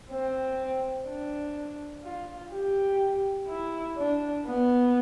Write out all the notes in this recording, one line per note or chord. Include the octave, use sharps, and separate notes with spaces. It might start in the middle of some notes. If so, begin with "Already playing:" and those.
C4
D4
F4
G4
E4
D4
B3